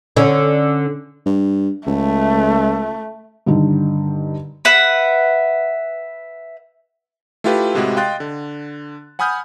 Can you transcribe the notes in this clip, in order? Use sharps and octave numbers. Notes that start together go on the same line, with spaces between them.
D3 C#4
G2
C#2 A3
G2 D3 D#3
B4 E5 F#5
A3 E4 F4 G4 B4
A2 C3 G#3 E4 F#4 G4
D#5 F5 G5 C6 F#6 A6
D3
F#5 G#5 B5 D#6 F6 G6